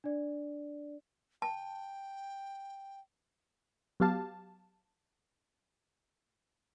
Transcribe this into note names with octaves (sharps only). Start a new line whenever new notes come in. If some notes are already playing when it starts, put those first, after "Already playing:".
D4 D5
G5 A5
F#3 B3 G4 F5 A5